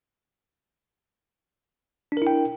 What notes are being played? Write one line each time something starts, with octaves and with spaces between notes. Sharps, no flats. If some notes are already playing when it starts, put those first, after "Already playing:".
D4 E4 A#4 G5